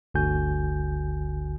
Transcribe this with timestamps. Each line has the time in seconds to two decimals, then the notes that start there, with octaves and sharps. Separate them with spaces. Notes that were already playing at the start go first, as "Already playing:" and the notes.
0.14 G1 D2 D3 F#4 G#5 G6